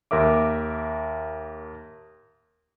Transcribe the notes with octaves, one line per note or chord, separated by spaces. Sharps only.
D#2 A#4 E5 D6